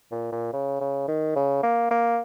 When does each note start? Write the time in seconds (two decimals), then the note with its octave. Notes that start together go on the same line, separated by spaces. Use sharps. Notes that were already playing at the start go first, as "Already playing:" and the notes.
0.11 A#2
0.32 A#2
0.53 C#3
0.81 C#3
1.08 D#3
1.36 C#3
1.63 A#3
1.91 A#3